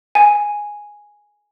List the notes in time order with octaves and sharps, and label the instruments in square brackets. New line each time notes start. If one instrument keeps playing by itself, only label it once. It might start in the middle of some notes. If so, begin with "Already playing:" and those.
[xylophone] G#5